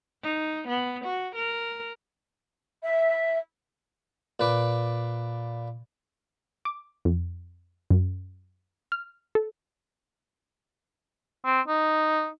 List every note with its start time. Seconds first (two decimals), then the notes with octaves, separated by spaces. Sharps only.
0.23 D#4
0.68 B3
1.05 F#4
1.35 A#4
2.83 E5
4.40 A#2 B4 D6
6.65 D6
7.05 F2
7.90 F#2
8.92 F6
9.35 A4
11.45 C4
11.68 D#4